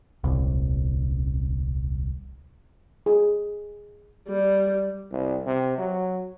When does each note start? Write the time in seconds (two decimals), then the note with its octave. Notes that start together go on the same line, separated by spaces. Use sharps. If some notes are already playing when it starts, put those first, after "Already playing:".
0.24 D#1 C2
3.06 G#4
4.29 G3
5.12 C2
5.46 C3
5.78 F#3